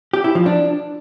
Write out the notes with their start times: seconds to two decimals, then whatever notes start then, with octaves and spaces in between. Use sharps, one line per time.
0.13 G4
0.24 E4
0.35 F3
0.46 D4